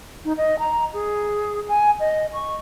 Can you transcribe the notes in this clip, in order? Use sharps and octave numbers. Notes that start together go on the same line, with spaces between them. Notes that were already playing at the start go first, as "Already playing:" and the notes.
D#4
D#5
A#5
G#4
G#5
D#5
C#6